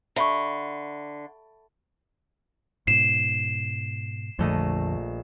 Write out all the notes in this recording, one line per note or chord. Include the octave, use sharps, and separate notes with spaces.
D3 E5 B5 C#6
G#2 B2 C7 E7
A#1 F2 D3 A3 D#5